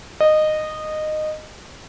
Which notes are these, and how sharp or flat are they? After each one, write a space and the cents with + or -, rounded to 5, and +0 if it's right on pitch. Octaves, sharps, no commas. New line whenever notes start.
D#5 -15